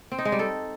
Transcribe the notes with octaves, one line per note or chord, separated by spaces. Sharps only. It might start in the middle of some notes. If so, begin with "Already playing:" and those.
C4
D#4
G#3
G3
A4